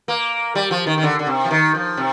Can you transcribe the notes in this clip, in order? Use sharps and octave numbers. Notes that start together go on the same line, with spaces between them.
A#3
G3
F3
D#3
D#3
D3
D3
C3
F3
D#3
F3
C3